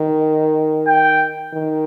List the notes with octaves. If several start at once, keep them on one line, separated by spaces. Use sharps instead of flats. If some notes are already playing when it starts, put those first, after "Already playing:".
Already playing: D#3
G5
D#3